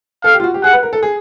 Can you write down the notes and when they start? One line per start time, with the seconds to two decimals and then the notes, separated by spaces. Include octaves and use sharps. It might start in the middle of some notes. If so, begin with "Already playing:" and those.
0.24 A4 F5
0.34 G4
0.40 F4
0.44 F#4
0.54 G4
0.64 G#4 F#5
0.73 B4
0.83 A#4
0.93 A4
1.03 G#4